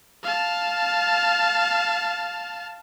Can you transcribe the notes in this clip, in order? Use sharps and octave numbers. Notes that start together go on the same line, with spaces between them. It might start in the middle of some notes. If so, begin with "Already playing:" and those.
F5 A5